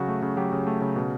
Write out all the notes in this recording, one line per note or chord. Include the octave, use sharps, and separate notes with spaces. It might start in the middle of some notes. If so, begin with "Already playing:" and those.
Already playing: C#3 F#3 F#4
A3
C#3
F#3 G4
C#3
A3
C#3
B2